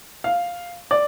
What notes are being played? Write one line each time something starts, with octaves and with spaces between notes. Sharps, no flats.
F5
D5